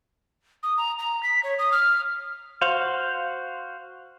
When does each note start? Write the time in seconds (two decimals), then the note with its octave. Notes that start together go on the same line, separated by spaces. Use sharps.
0.63 D#6
0.77 A#5
0.99 A#5
1.23 B6
1.43 C#5
1.58 D#6
1.72 F6
2.61 F#4 C5 F5